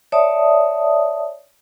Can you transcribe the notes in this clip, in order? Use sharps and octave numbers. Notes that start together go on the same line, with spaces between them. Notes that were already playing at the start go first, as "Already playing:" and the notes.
C#5 D5 E5 A5 D#6